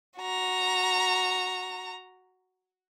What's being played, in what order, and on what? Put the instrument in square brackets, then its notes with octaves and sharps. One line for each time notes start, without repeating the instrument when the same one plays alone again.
[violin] F#4 A#5